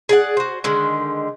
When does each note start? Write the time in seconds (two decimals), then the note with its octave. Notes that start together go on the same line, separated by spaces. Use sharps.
0.09 G#4 D5 F#5
0.37 F#4 C5
0.64 D3 D#3 G#3